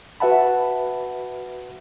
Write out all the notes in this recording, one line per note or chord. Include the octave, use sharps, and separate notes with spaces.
F#4 B4 E5 F#5 A5 B5